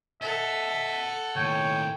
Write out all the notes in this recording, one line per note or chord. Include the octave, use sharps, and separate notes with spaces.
A4 D#5 E5 F#5
D#2 A2 C#5 G5